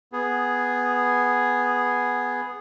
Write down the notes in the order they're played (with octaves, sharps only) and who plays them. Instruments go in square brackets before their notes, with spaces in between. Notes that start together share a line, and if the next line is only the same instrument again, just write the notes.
[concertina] B3 G#4